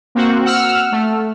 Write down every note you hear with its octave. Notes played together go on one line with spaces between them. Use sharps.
A#3 C4 F#4
F#5 E6 F6
A3